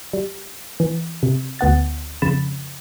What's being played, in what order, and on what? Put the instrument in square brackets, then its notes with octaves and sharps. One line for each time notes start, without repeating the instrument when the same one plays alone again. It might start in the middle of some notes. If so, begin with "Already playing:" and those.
[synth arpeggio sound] G3
E3
C3
D2 B3 F#5 A6
F2 C#3 B5 A6 E7